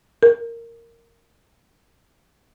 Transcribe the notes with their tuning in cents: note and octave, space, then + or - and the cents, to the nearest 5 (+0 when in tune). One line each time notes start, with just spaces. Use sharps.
A#4 -10